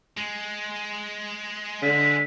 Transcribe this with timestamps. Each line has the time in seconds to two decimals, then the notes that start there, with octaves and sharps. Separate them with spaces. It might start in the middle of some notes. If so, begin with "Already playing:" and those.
0.17 G#3
1.82 D3 B6